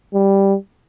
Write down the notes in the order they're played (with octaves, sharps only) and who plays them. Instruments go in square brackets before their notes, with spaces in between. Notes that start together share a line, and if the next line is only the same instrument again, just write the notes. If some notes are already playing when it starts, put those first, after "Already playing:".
[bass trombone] G3